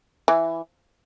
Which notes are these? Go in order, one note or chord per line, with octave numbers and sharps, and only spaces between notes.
E3